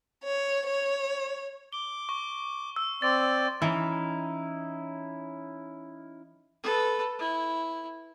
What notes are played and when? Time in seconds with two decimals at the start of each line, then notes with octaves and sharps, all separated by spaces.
0.23 C#5
0.65 C#5
1.73 D6 G7
2.09 C#6
2.76 E6
3.02 C4 D5 A6
3.62 E3 C#4 D#4 E4
6.64 A4 B4
7.19 E4